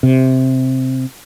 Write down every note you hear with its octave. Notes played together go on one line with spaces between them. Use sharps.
C3